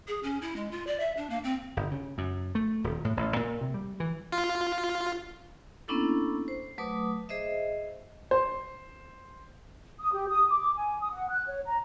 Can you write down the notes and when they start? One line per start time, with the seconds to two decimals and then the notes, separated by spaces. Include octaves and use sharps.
0.08 G#4
0.23 C#4
0.42 E4
0.56 G#3
0.71 F4
0.87 D5
1.00 E5
1.17 D4
1.30 A#3
1.44 C4
1.77 G1
1.91 C#3
2.18 F#2
2.55 A3
2.84 D#1
3.05 A2
3.17 A1
3.36 A#2
3.61 C3
3.74 G3
4.00 E3
4.32 F4
5.88 A#3 B3 C#4 D4 E4 A4
6.48 C5
6.78 F#3 A3 B4 D6 D#6
7.29 G#4 C5 D#5 E5
8.31 C5
10.00 D#6
10.13 G4
10.29 D#6
10.50 D6
10.75 G#5
11.00 D#6
11.12 F#5
11.30 F#6
11.48 C#5
11.66 A#5